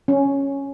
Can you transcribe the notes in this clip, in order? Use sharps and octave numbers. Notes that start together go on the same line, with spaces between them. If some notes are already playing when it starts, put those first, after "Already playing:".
C#4